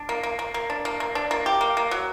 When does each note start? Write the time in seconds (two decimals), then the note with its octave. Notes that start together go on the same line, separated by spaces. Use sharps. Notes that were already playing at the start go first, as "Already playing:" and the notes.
Already playing: D4
0.09 A#3
0.23 A#3
0.39 A#3
0.54 A#3
0.70 D4
0.85 A#3
1.00 A#3
1.15 D4
1.31 A#3
1.46 G4
1.61 A#3
1.77 A#3
1.91 F#3